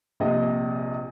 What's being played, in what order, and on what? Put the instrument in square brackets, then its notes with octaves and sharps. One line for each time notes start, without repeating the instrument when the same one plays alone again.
[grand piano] A#1 C3 D#5